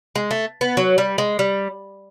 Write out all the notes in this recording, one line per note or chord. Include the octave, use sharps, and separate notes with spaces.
G#3
A3
B3
F#3
G3
G#3
G3